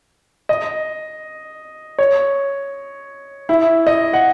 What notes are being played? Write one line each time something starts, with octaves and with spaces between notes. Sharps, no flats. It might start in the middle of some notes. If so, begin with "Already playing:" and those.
D#5
C#5
E4
D#5
F#5